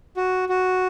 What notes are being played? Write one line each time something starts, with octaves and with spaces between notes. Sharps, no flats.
F#4
F#4